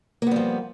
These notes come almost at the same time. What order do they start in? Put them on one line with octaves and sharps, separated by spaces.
A#3 B3 G3 F3